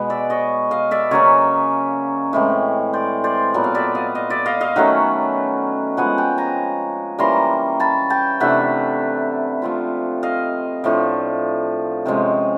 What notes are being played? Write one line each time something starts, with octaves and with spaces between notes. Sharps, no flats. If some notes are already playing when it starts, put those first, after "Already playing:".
Already playing: B2 G#3 B3
D5 E5
C#5 D#5
D#5 F5
D5 E5
C#3 F#3 A#3 C#4 C#5 D#5
A2 E3 G#3 C4
C5 D5
C5 D5
A#2 F#3 B3
F5
D5 E5
D#5 F5
D#5 F5
D5 E5
D#5 F5
D#5 F5
D#3 F#3 A3 C#4 E5 F#5
F3 G#3 B3 F#5 G#5
G5 A5
G#5 A#5
E3 G3 A#3 C#4 A#5 C6
A5 B5
G5 A5
C3 E3 A3 D4 E5 F#5
F3 A3 C4 F4
D#5 F5
A2 F3 A3 D4
C3 F3 G#3 C#4